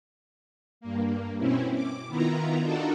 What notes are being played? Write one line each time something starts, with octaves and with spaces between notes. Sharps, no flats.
G2 A#3
B2 C4 C#4 E4
D6
D#3 B3 E4 F4 A#5
D4 D#4 F4 F#4 A4 A#4